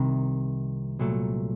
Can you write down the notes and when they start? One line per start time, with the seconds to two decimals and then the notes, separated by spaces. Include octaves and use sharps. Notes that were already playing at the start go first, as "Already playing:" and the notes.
Already playing: C2 C3 D#3
0.99 C2 A#2 F#3 A3